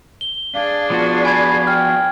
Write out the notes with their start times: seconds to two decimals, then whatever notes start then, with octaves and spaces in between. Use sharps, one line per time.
0.21 G7
0.55 D4 G#4 F5
0.90 F3 B3 F4 F#4
1.25 G#5 B5 G#6
1.67 G5 F6